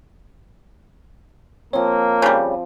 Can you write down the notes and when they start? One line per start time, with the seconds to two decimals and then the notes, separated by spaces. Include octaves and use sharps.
1.73 F3 A#3 C4 C#5
2.22 C#3 G3